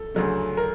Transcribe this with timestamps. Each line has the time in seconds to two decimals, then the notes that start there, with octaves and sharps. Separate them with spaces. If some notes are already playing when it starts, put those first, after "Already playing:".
Already playing: A4
0.14 D2 C#3 F#3 A3
0.57 A#4